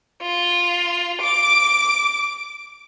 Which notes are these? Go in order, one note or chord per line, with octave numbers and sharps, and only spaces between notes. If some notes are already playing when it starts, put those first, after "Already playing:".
F4
D6